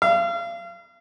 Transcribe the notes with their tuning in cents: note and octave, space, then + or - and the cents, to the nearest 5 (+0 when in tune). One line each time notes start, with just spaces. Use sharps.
F5 -35